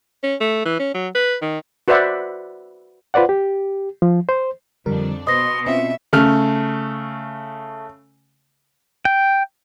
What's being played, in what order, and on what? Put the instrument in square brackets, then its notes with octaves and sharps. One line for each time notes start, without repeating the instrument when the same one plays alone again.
[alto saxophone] C#4
A3
E3
C#4
F#3
B4
D#3
[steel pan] F#4 B4 C5 D5 E5 F#5
[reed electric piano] F4 B4 C5 D5 F#5
G4
F3
C5
[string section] F2 D4 [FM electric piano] D3 G3 A#4
[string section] B2 [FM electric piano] B4 C5 D#5 [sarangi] C6 [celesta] D#6 A#6
[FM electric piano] C4 C#4 F4 [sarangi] E5
[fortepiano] C#3 A3 F6
[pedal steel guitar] G5